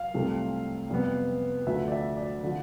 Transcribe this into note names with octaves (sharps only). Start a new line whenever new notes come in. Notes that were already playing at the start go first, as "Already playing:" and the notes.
Already playing: F5
C2 C3 F3 A3
F2 C3 G3 B3
D2 D3 F3 A3 E5
D5
E5
D5
D3 F3